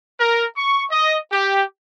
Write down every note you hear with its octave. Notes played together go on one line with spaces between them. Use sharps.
A#4
C#6
D#5
G4